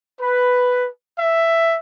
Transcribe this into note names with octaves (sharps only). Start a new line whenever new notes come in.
B4
E5